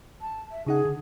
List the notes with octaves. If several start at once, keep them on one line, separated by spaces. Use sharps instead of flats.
A5
E5
C#3 D#4 G#4 F#5
D3